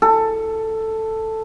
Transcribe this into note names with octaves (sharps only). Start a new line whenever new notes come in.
A4